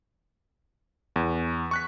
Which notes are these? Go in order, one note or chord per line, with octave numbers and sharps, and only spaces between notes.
E2
C#6 F#6 B6